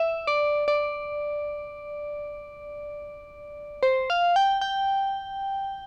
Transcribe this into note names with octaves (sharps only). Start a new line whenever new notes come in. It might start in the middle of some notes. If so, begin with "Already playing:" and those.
Already playing: E5
D5
D5
C5
F5
G5
G5